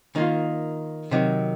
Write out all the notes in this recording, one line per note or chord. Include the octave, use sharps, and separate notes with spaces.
D#3 A#3 F4
C3 D#3 F#3